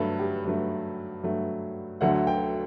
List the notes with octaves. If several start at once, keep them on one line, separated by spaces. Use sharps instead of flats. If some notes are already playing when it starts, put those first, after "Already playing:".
Already playing: G2 F#3 A3 A4 B4
G4
G2 F#3 A3
G2 F#3 A3
D2 D3 F#3 A3 F#5
G5